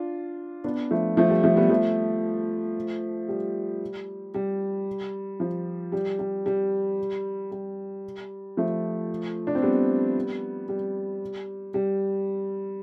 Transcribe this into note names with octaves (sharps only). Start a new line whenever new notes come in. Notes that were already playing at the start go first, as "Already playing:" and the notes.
Already playing: D4 F4
B3 D4
F3 A3
F3 A3
G3
F3 A3
G3 B3
F3 A3
G3
G3
F3
G3
G3
G3
G3
F3 A3
D4
C4
G3 B3
G3
G3